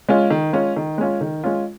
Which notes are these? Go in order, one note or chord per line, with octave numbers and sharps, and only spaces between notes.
G#3 C#4 F4
D#3
G#3 C#4 F4
D#3
G#3 C#4 F4
D#3
G#3 C#4 F4